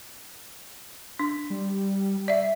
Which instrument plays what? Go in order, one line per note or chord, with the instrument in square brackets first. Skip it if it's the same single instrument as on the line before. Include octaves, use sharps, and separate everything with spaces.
[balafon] D4
[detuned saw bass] G3
[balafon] D5 E5